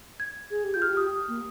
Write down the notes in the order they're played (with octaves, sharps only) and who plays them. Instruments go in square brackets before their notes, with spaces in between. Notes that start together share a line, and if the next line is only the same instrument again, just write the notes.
[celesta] G#6
[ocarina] G#4
G4
[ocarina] F4 [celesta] G6
[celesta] F6
[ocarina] G4
[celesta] D#6
[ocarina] A#3